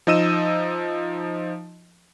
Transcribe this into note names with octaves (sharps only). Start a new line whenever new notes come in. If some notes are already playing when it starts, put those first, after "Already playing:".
F3 D#4 D#5 E6 D#7 E7